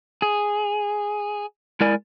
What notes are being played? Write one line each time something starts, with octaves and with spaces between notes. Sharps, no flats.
G#4
G#3 E4 A#4 D5 G#5